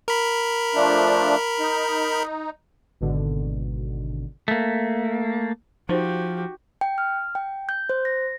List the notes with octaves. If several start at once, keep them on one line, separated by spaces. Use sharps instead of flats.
A#4 B5
F3 A3 D4
D#4
G#1 B2 D3
A3 A#3
F3 D#4 F#4 G4 C5
G5
F6
G5
G6
C5
A#6